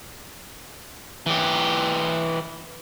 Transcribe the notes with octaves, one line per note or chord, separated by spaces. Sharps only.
E3 G4